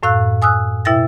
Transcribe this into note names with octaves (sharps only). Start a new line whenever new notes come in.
F#2 A2 F5 E6 F#6
G#5 D#6 E6 F#6
B2 E4 E5 G5 A6 A#6